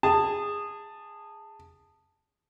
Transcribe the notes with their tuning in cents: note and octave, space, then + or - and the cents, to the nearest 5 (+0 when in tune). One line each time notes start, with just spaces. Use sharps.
G#4 -15 A5 +10